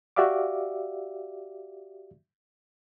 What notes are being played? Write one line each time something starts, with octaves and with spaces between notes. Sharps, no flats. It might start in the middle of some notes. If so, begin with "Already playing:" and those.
F#4 G4 D5 E5 F5 D6